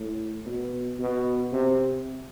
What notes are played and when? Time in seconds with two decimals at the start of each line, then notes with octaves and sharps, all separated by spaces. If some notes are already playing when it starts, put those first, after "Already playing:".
Already playing: A2
0.46 B2
0.99 B2
1.52 C3